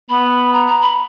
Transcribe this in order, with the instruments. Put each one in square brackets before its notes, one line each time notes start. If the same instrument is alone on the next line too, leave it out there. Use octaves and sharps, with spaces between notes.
[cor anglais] B3 [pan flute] B5
[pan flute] A#5
A#5
B5